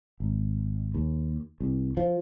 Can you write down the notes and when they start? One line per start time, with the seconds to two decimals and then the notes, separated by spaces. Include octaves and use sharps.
0.20 G#1
0.95 D#2
1.60 C2
1.97 F3